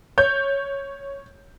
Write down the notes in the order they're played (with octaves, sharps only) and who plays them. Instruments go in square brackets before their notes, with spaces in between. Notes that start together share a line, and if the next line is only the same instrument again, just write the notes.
[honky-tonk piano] C#5 G6